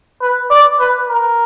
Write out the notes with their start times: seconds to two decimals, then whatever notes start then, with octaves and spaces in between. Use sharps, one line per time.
0.21 B4
0.50 D5
0.79 B4
1.09 A#4